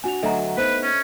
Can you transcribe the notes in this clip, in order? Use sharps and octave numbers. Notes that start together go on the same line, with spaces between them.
D4 F#4 G#5 F7
D2 F#3 D4 A4 D#5 E5 A#5
B3 D#4 B4 C5
C#4